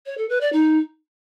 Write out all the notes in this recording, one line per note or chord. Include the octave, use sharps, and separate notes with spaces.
C#5
A4
B4
D5
D#4